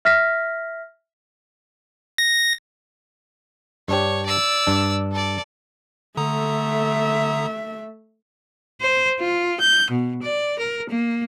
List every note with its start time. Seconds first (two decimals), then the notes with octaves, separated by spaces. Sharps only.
0.05 E5 F6 A#6 B6
2.18 A#6
3.88 G2 D4 G4 C#5
4.26 D5 E6
4.67 G2 D4
5.12 A4 D5
6.17 D3 A3 E5 A#5 D#6
8.80 C5
9.20 F4
9.60 G6
9.89 B2
10.20 D5
10.58 A#4
10.89 A#3